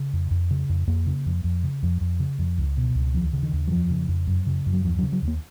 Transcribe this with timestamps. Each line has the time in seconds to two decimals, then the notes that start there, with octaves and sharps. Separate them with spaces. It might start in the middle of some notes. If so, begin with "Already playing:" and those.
Already playing: C#3
0.13 F2
0.31 F2
0.51 C#3
0.69 F2
0.87 F2 A#3
1.06 C#3
1.26 F2
1.44 F2
1.64 C#3
1.83 F2
2.01 F2
2.20 C#3
2.39 F2
2.58 C#2
2.77 B2
2.95 C#2
3.14 D#2 F3
3.33 C#3
3.43 D#3
3.53 D#2
3.68 F#3
3.71 F2 F3
3.90 C#3
4.08 F2
4.27 F#2
4.47 C#3
4.66 F#2
4.73 F#3
4.84 D#2 F3
4.99 F#3
5.03 C#3
5.12 F#3
5.22 D#2
5.28 A#3